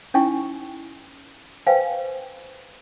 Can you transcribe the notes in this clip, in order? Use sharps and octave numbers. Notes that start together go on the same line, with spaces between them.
C#4 D#4 E4 G5 G#5 C#6
B4 C5 F5 G5 G#5